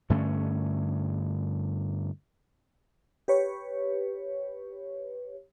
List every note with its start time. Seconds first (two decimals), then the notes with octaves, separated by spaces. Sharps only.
0.10 G2 D3 A3 C#4
3.28 G4 B4 C#5